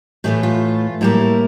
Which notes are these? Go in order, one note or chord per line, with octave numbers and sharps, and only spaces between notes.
A2 E3 A3 G4
F4
A2 G3 A#3 E4